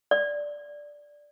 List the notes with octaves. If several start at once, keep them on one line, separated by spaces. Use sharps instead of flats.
D5